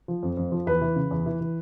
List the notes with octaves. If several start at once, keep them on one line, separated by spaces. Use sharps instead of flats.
F3
F2
F2
F3
E2 B4
E3
C#3
E2
E3
E3